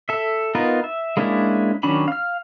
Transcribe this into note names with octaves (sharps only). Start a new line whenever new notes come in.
A4 E5
B3 D#4 F4 A#4 B4
E5
G#3 A#3 C#4 D4 E4
D#3 F#3 C#4 D4 B5
F5 F6